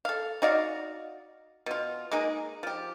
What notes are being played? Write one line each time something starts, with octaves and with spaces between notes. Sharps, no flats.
A4 F5
D#4 F#4 D5 F5
B2 F4
G#3 A#3 D#4 G#4
F3 G4